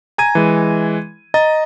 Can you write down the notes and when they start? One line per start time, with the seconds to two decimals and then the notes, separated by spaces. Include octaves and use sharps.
0.18 G#5 A#5 G#6 D#7
0.35 E3 G#3
1.34 D#5 A#5 A6